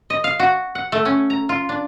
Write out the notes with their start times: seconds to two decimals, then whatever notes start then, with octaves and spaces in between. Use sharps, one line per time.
0.10 D#5
0.24 F5
0.39 F#4
0.75 F#5
0.92 A3
1.05 C#4
1.30 A#5
1.49 F4
1.69 D4